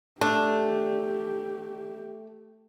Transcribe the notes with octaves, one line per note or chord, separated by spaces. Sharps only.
A3 D4 G4